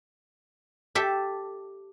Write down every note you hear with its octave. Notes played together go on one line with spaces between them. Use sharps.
G4 A4 E5